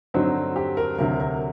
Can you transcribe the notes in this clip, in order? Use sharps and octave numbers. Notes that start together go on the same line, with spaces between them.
G2 D3 F#3 C4 D#4
G4
A#4
D2 C3 F#3 A#4
A#4